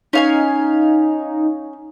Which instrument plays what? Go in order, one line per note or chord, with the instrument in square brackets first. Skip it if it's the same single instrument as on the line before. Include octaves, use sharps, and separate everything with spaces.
[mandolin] C#4 F5 G#5 [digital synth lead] D#4